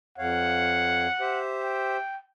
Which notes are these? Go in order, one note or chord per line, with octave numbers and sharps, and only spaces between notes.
F2 C#5 F5 F#5
G4 C5 E5
G5